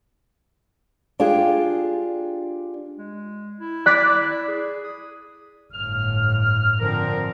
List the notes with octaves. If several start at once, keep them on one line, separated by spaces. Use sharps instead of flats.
D4 F4 G4 G#4
G#3
E4
D5 F#6 B6
G#4
D#6
G1 A2 F6
A#2 D3 F3 C4 A#4